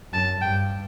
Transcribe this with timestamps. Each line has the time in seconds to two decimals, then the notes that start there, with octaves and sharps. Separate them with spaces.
0.12 F#2 A5
0.41 G2 G5